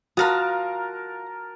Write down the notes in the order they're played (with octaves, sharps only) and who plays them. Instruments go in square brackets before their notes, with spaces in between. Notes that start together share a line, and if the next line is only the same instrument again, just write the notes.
[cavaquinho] F4 F5 D#6 [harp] F#4 [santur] A#4 A5 A#5